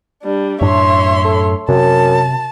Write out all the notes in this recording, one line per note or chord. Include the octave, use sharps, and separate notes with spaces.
G3 D4
F#2 A2 D4 C#5 E5 C6
A4
F#2 C3 A5